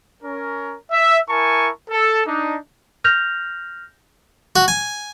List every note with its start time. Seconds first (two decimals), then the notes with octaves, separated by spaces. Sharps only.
0.23 C#4 A#4
0.92 E5
1.29 E4 A#4 G#5 A5 C#6
1.90 A4
2.27 D4 D#4
3.04 F6 G6 A#6 F7
4.56 F#4
4.68 G#5